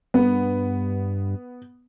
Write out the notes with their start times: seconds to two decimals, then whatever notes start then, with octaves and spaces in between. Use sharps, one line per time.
0.14 G2 B3